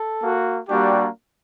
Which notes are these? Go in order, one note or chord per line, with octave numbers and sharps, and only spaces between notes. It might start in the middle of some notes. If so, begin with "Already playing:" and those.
Already playing: A4
A#3 F#4
G3 A#3 D4 F#4 G4